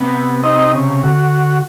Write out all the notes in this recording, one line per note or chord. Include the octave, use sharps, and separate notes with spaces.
C3 B3
C4 D#4 D#5
C#3
D3 F#4